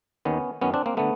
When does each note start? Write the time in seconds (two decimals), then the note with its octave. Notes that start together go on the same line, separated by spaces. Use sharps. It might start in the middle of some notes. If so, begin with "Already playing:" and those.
0.25 D#2 D#3 B3 C#4
0.62 F#2 D#3 B3 C#4
0.74 C4 D4
0.86 A#3 C4
0.97 D3 A3 B3